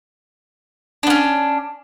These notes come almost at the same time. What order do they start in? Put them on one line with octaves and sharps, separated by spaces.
D4 B3 C#4